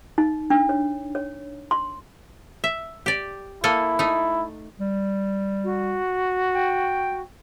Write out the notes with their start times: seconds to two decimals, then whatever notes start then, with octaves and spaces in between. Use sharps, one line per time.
0.18 D#4
0.50 D4
0.69 C#5
1.15 C#5
1.71 C6
2.64 E5
3.06 G4 D5
3.64 A#3 E4 A4 G#5
3.99 A3 D#4
4.80 G3
5.63 F#4
6.55 G5